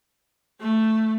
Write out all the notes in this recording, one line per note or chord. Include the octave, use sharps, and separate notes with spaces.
A3